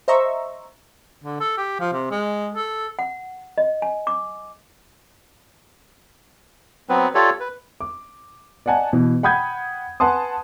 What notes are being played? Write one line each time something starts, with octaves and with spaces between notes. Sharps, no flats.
C5 D#5 E5 A#5 C#6
D3
A4
G4
F3
C3
G#3
A4
F#5
D#5
G#5
D6
F#3 B3 C4 B4
F4 G4 A4 C#5 D5
B4
D6
D5 D#5 F#5 G#5 A5
B2 E3
F#5 G5 B5 D#6 G6 G#6
B4 F#5 G#5 A5 C6 D#6